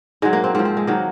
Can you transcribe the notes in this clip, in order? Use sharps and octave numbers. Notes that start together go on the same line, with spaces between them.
G#2 F#3 G#3
A#3
C4
G#2 F3 C4
C4
G#3
D#3 F#3 A#3